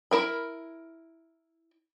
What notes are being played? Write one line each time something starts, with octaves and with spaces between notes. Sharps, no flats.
E4 A#4 B5